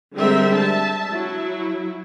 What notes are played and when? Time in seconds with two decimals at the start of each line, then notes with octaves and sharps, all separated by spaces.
0.16 D3 G3 G#3 C4 A#4 E5
0.57 E5 A5
1.11 F#3 E4